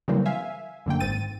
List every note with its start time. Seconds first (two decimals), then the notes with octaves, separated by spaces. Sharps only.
0.08 C#3 E3 F#3 G3 A#3 C4
0.26 E5 F5 G#5
0.86 F#2 D3 A#3 G5
1.00 G#1 G#2 C4 A6 D#7